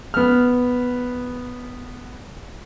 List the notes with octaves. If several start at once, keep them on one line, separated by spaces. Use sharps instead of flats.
B3 F6